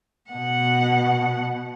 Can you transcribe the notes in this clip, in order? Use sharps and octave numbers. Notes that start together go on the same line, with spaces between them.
B2 F#5